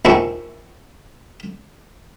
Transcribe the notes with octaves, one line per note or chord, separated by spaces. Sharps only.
A#1 D#2 F3 E4 C#6